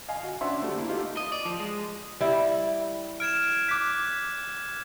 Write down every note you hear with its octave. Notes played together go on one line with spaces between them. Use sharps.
D#5 F5 G#5
F#4
C#4 D4 C5 E5 F#5 C6
F#3 G3 A3 F#4 C5
A#3 E4
A3 D#4 F4 G4
D#5
D5
F3
G#3
G3 E4
F6 G#6 D7 E7
D6 F#6 B6